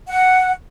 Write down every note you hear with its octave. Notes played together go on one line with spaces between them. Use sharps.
F#5